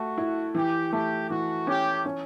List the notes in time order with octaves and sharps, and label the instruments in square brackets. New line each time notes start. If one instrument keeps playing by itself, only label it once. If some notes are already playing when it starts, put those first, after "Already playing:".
Already playing: [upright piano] A3 [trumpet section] F#4
[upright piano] E4
[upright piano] E3 [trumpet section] G4
[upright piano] A3 [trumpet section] G4
[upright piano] E3 [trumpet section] F#4
[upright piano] C#4 [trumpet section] G4
[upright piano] C#4